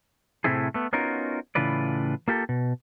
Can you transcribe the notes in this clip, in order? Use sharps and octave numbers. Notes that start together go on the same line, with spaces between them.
A2 C3 A3 C4 E4 G#4
A3 B3
B3 C#4 D#4 F4 F#4 A#4
A2 C#3 E3 F4 B4 D5
A#3 F4 G4 A4
B2